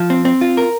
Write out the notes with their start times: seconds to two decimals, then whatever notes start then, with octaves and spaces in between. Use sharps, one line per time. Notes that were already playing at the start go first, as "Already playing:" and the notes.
Already playing: F3
0.10 C4
0.25 C4
0.41 F4
0.57 A#4